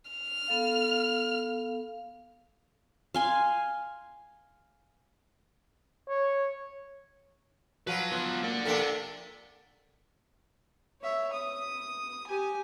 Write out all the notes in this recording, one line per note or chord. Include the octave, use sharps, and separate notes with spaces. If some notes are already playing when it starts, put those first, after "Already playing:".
F6
B3 A4 F5
F5 G#5 C6
C#5
F3 F#3 F#4 B4
B3 F4
A#3 D5 F#5
F2 C3 D4 A4 A#4
C#5 E5
D#6
G4 G#5